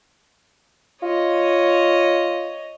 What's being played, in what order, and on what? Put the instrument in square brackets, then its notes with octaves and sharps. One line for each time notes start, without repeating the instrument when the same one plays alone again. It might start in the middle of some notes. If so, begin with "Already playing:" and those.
[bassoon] F4 [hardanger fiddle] C#5 D#5